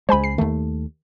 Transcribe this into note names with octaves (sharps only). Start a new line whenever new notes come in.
C#2 G#3 C5 G#5 B5
C7
D#2 D#3 A3